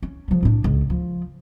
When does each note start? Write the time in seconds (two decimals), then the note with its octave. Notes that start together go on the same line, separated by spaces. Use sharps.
0.03 C#4
0.28 F3 G3
0.43 A2 D4
0.64 C#2
0.90 F3